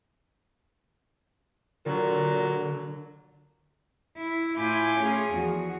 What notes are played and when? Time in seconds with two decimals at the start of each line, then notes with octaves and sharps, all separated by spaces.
1.86 A#2 D3 F#3
4.16 E4
4.57 A2 E4 F4 G#5 D6 G6
4.97 A3 C#4 F4 G#4
5.31 E2 F3 F#4